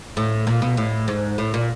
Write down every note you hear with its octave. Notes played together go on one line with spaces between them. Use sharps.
A2
A#2
B2
A2
G#2
A2
A#2